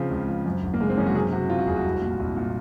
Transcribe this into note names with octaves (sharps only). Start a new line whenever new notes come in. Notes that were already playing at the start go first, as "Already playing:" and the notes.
Already playing: C#3 F3 C4
C#2
F3
F#2
G#1
A#3
C#3 G#3
C4
F#2 C#4
F#4
C3 G#4
C3 F#4
C3 F4
F#4
F1 G#4
F#4
C2
A#2
C2
A#2